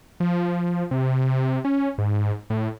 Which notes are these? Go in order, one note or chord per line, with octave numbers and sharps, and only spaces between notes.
F3
C3
C#4
G#2
A2